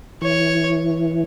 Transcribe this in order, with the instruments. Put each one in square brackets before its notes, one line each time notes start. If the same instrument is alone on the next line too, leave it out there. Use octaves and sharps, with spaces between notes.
[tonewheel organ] E3 [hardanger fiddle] C#5